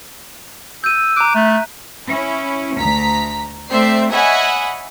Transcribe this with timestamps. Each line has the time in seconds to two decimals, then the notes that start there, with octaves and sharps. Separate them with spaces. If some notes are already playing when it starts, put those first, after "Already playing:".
0.84 E6 G6 D#7
1.16 A#5 D6 F#6
1.35 A3 E5
2.08 C#4 E4
2.78 D2 A#5 B6
3.70 A3 C4 C5 D5 E5 C7
4.12 C#5 D#5 E5 F#5 G#5 B5